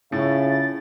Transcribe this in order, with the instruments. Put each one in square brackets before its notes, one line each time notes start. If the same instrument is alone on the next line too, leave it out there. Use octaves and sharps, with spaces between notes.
[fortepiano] A2 [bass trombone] C#3 [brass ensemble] F4 C#5 E5 [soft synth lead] A6